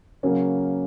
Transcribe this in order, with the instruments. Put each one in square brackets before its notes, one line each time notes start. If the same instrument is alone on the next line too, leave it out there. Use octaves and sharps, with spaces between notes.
[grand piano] C#3 F#3 A#3 C#4